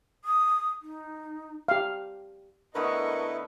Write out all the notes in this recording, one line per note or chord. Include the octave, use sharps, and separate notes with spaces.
D#6
D#4
G4 F5
D3 A3 B3 E4 A#4 B4 D#5 C#6